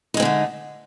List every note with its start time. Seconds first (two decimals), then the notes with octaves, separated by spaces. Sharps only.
0.14 D#4
0.17 G#3
0.20 C4
0.22 D3
0.25 A3